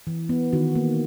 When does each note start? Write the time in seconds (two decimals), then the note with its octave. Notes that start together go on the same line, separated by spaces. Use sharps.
0.07 E3
0.29 B3
0.53 D#3 F#4
0.75 A#3